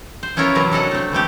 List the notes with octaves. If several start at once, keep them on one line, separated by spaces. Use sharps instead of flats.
C5
B3 C#4 E4 F4 A#4 C#5
C3 E3 F#3 A#4
D4 A4 D#5 F#5
A3 C4
E3 G#3 A3 G4